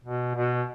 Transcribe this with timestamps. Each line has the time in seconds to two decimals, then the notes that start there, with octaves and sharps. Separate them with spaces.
0.04 B2
0.35 B2